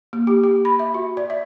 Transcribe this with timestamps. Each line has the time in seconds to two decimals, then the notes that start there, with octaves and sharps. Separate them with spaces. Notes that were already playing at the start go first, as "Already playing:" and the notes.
0.13 A#3
0.27 G4
0.44 G4
0.65 B5
0.79 E5
0.94 F#4
1.17 D5
1.30 E5